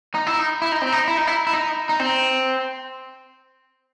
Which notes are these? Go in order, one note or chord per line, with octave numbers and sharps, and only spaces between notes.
D#4
E4
D#4
E4
D#4
C4
D#4
E4
D#4
E4
E4
D#4
D#4
C4